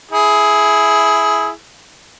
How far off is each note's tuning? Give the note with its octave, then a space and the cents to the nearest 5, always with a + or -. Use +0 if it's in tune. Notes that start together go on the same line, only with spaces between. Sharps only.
E4 +0 G#4 +15